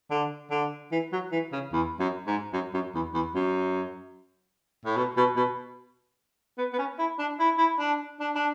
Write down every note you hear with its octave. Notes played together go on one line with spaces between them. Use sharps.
D3
D3
E3
F#3
E3
C#3
E2
F#2
G#2
F#2
F#2
E2
E2
F#2
A2
B2
B2
B2
B3
B3
C#4
E4
D4
E4
E4
D4
D4
D4